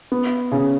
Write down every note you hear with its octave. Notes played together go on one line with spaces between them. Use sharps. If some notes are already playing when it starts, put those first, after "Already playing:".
B3
C#3